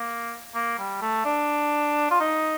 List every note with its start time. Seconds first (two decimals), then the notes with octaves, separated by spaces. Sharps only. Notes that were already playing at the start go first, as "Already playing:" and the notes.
Already playing: A#3
0.55 A#3
0.79 G3
1.01 A3
1.25 D4
2.11 F4
2.20 D#4